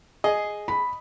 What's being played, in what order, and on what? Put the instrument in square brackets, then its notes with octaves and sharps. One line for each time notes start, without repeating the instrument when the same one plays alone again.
[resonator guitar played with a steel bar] G#4 [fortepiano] D#5
[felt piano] B5